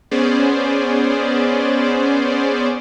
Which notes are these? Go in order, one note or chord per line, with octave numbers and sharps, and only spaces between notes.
B3 C#4 G#4 C5 D5